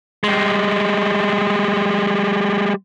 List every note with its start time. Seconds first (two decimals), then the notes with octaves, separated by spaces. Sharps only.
0.24 G3 G#3